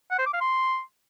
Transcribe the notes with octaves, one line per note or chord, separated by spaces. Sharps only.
F#5
C5
D6
F5
C6